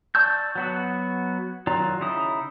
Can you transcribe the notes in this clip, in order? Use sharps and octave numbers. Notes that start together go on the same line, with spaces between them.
D5 A5 C#6 E6 G6
F#3 B3 F#4
D#3 F#3 F4 D5 A#5
C#3 D#4 E4 D#6